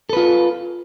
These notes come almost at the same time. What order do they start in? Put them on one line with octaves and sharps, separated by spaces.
A4 B4 F4